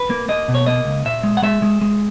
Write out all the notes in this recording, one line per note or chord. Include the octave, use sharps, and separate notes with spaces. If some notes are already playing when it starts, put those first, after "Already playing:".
Already playing: B4
A#3
A#3 D#5
B2
C#5
A#3 D#5
C#2
A#2 E5
G#3
F#5
G#3 E5
G#3
G#3